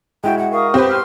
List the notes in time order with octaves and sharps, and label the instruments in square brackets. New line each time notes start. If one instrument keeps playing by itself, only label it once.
[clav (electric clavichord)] G#3 E4 F#4 [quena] G5
[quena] F#5
[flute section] A#4 C#6 D#6 [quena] F5
[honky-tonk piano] C4 B4 [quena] G4
[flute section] C6 F6